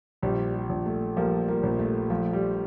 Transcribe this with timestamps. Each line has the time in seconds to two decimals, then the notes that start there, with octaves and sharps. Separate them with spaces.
0.22 A#1 G3
0.54 G3
0.69 A#1
0.86 A3
1.16 F3 G3 A#3
1.48 G3 A#3
1.63 A#1
1.79 A3
2.10 F3 A3
2.33 G3